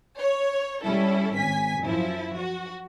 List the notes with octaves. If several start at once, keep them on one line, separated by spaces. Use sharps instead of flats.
C#5
G3 C#4 E4 A4
G#1 G#5 B6
F#2 F3 E4
F#4